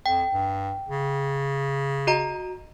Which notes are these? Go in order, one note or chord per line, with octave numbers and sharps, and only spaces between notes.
F2 G5
G2
C#3
F#4 D#5 A#5